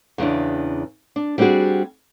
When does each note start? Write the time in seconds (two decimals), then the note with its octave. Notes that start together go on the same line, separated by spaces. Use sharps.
0.18 E2 C#3 E3 D4
1.16 D4
1.38 G3 C4 D4 D#4 F#4 G#4